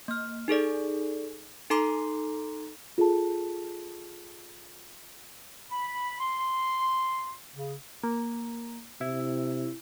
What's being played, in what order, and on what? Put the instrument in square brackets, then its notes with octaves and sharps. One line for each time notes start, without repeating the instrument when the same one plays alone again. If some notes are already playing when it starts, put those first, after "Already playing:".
[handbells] A#3 F6
D#4 G#4 A4 D5
D#4 A4 A#5 C6 D6 C7
[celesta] F4 G#4 A4 A5
[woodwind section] B5
C6
C#3
[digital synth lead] A#3
[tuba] C3 [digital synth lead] E4